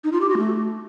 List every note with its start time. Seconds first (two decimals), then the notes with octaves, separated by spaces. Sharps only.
0.04 D#4
0.12 F4
0.21 G4
0.29 F#4
0.38 A3